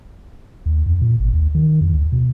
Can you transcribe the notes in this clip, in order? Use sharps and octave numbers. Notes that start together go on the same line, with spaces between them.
D#2
F2
A#2
G#1
D#2
D#3
F2
D2
B2